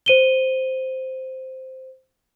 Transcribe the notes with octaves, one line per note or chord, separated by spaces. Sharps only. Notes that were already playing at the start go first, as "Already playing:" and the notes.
C5 D#7 G7